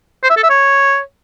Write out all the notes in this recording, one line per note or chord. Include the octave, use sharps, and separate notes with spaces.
C5
E5
A4
E5
C#5